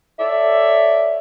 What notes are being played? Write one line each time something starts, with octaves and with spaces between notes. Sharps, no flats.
A4 C#5 D5 E5